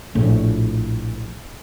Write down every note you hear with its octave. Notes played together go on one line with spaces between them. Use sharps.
A#1 A2